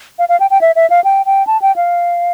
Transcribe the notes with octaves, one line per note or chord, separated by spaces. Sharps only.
F5
F5
G5
G5
E5
E5
F5
G5
G5
A5
G5
F5